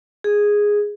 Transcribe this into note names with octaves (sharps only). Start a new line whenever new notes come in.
G#4